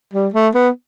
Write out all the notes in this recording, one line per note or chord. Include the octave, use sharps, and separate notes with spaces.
G3
A3
B3